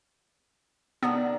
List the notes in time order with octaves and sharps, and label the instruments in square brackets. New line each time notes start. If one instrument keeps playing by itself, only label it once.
[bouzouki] C3 D#3 D4 [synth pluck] B3